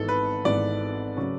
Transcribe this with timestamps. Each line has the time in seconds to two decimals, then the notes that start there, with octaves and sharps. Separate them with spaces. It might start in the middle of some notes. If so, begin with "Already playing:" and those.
Already playing: G#1 G#2 E3 B3 A4
0.08 B4
0.45 G#1 G#2 E3 B3 D5
1.17 C#3 F#3 C#4 F#4